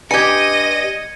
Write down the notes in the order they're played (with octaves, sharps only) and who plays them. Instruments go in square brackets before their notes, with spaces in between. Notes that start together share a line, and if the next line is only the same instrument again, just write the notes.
[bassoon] G2 [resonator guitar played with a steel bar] G4 G#5 [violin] D#5 [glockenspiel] G#6 C#7